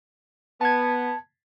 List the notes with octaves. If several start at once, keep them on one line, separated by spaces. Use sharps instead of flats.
B3 A5 G#6